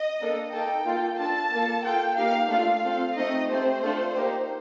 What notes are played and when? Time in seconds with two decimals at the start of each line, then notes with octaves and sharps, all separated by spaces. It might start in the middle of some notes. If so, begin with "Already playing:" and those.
Already playing: D#5
0.21 A#3 D4 A4
0.52 A#3 D#4 A4 G5
0.86 A#3 F4 A4
1.19 D4 F4 A4 A5
1.52 A#3 F4 A4
1.85 A#3 F4 A4 G5
2.18 A#3 D#4 G4 F5
2.50 A3 D4 F4 F5
2.84 C4 F4 A4
3.17 A3 C4 D#4 D#5
3.50 A3 C4 G4 C5
3.82 A3 D4 F4 A4
4.16 A#3 D#4 G4